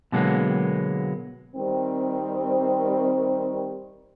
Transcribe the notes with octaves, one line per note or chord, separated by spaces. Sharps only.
B2 D3 F#3 G#3 A#3 B3
D#3 G3 C4